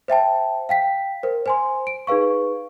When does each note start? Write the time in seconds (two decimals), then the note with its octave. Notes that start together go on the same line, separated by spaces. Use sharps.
0.08 C5 E5 G5 A5
0.69 F5 G5 B6
1.23 A#4 C5
1.46 C5 G#5 C6
1.87 D7
2.07 D#4 G#4 B4 F5 C#6